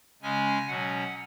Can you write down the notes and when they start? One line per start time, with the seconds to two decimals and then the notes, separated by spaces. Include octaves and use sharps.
0.22 C#3 G#3 C#4 G#5
0.67 B2 F#3 C#4 F#5